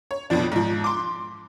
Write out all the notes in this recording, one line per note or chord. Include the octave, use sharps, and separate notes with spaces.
C#5
F2 B2 F3 D4
G#2 F3
C6 D6